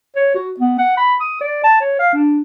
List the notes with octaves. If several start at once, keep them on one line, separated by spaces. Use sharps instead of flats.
C#5
F#4
B3
F#5
B5
D#6
D5
A5
C#5
F5
D4